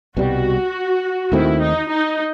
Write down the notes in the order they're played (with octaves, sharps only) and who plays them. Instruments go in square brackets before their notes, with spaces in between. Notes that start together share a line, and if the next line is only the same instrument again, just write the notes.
[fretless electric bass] C2 B2 G3 [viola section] F#4
[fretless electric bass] D#2 D#3 A3 C4 [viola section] E4
[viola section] D#4
D#4